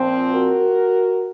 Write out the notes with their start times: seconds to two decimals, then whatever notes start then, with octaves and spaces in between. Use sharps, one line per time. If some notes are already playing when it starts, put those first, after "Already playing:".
Already playing: A#2 F3 C4
0.32 F#4 A#4